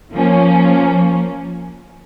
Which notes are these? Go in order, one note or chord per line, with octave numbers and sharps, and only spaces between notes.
F3 A#3 C#4